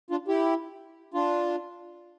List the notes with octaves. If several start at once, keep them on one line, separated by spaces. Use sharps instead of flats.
D4 F4
E4 G4
D4 F4